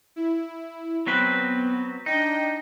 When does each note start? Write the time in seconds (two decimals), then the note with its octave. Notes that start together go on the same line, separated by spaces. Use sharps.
0.16 E4
1.06 F#3 B3 C4 B4
2.06 D4 D#4 D#5 G5